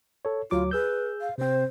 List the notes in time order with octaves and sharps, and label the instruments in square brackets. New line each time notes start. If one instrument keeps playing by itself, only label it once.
[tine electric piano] A4 C#5
[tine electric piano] D2 F#3 D6 [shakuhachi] F4
[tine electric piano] G#4 E6 G6 [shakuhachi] B4
[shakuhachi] F5
[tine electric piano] C3 C4 [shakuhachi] C5